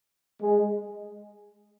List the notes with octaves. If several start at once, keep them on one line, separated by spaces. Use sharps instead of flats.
G#3